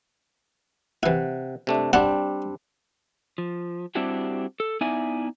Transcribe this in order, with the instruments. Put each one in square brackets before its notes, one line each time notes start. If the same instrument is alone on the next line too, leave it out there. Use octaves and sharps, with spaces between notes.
[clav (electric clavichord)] C3 F#5 [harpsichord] E3 E4
[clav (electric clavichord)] C3 A3 D4
[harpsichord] C3 F#5 A5 [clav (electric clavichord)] G3 C4 D4
[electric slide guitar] F3
G3 C4 D4 E4 F#4 G4
A4
B3 D#4 E4 D5 E5 G#5